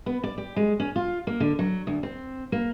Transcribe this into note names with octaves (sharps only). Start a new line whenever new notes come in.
B3
D5
G4
G#3
C#4
F4
A#3
D3
F#3
D2
C4
A#3